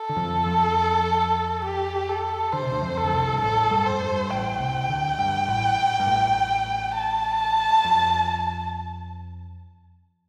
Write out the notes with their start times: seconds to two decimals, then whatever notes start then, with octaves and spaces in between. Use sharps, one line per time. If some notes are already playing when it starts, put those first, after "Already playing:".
Already playing: A4
0.09 D3
0.16 F2 F3
0.46 F2 F3
1.64 G4
2.09 A4
2.53 D3 C5
2.63 C3
2.72 D2 D3
2.82 F2 F3
2.97 A4
3.04 D3
3.12 C2 C3
3.33 G2
3.41 A1 A2 A4
3.71 G2 G3
3.86 F2 C5
4.01 G2
4.30 A1 A2 G5
4.59 C2 C3
4.89 D2 D3
5.19 G2
5.48 A1 A2
6.00 G2
6.07 A1 A2
6.96 A5
7.85 F2